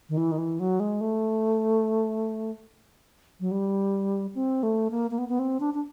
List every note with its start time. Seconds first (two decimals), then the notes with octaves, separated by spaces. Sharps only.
0.09 D#3
0.17 E3
0.32 D#3
0.38 E3
0.59 F#3
0.80 G#3
1.01 A3
3.40 F#3
3.51 G3
4.35 C4
4.63 A3
4.91 A#3
5.11 A#3
5.18 B3
5.29 B3
5.39 C4
5.60 D4
5.74 D4